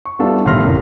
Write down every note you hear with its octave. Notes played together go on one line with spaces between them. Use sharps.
C#6
G3 B3 D4 E4 F4 A4
G1 A2 D#3 C6 F6 A#6
F1 C2 C#4 A#4